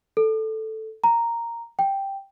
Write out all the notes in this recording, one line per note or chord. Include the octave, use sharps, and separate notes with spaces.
A4
A#5
G5